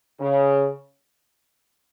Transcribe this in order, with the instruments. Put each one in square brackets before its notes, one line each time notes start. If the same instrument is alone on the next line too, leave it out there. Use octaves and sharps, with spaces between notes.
[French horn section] C#3